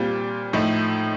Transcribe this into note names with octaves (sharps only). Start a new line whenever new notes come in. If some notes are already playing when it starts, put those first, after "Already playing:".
Already playing: A#2 G3 C4 F4
A2 F3 A3 D#4